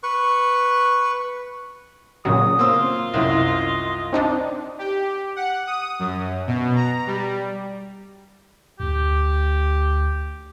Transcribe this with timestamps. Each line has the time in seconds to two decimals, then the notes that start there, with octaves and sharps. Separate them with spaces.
0.03 B4 C#6
2.25 A#2 C#3 F#3 D#6
2.59 A#3 C4 F4 E6
3.14 C2 F#2 D#5
4.13 C4 D4 D#4
4.79 G4
5.36 F#5
5.67 D#6
5.99 F#2
6.47 B2
6.76 A#5
7.07 G3
8.80 D2 G4